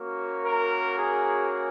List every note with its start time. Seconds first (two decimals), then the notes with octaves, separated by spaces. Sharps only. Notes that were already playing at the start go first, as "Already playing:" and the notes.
Already playing: A#3 C#4 F#4
0.43 A#4
0.97 G#4